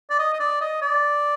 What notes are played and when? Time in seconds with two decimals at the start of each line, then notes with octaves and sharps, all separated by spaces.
0.10 D5
0.19 D#5
0.33 D#5
0.40 D5
0.61 D#5
0.82 D5